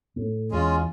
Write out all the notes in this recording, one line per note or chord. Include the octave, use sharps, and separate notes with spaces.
A2
E2 G#3 C#4 F4